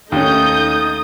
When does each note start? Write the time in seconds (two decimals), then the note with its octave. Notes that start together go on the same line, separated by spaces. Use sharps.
0.12 D#2 A3 C#4 D#4 D#6 G6